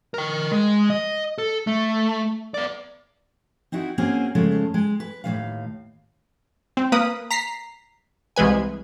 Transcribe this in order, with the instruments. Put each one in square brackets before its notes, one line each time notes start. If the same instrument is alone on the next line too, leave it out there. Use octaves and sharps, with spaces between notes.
[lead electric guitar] A#4 G5
G#3
D#5
A4
A3
B3 D5
[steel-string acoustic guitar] C4 D#4 E4 F#4
A#3 C4 C#4 F#4 G#4
F2 C#3 G#3 A3
G#3
B4
D#2 A2 C3 F5
[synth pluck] C4
A#3 B4 D#6
A#5 B6 C7
C2 E3 G#3 B4 G#5